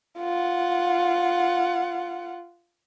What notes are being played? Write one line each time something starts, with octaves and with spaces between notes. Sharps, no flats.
F4 F#5